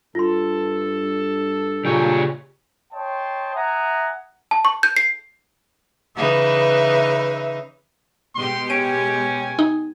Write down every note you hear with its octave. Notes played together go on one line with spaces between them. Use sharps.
G2 F4 A4 C6
A#2 C#3 G4 C#5
C#5 D#5 G5 A5 C6
E5 F#5 G#5 A#5 D#6
A5
C#6
G6
C7
C#3 E3 D#4 B4 E5
B2 G#3 G4 C6
C#4 G#5 D7
D#4